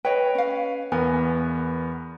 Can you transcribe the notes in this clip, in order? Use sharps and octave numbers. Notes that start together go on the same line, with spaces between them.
B4 C#5 D#5 G5
C#4 F5
E2 B3 A#4 G#5